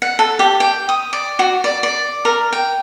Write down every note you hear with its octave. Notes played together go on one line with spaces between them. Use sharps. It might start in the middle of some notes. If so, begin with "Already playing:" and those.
F#5
A4
G4
G5
D#6
D5
F#4
D5
D5
A#4
G5